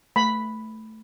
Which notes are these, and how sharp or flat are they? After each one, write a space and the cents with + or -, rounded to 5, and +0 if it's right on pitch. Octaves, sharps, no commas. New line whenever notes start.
A3 +0 B5 +0